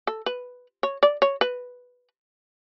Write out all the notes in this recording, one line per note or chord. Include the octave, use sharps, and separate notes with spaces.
A4
B4
C#5
D5
C#5
B4